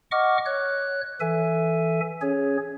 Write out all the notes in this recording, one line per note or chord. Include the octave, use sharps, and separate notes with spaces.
D#5 F#5 C#6 D6 F6
C#5 F#6
E3 A4 E5 G#5
C#4 G#4 C#5